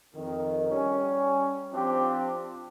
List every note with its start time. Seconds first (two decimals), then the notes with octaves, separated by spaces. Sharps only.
0.14 F2 D#3
0.69 G3 C#4
1.72 F3 C4 D4 F4 G4